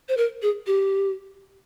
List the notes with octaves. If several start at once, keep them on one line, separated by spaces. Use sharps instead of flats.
C5
A#4
G#4
G4